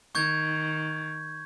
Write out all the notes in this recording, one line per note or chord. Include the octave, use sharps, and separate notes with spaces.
D#3 C#6 G6 G#6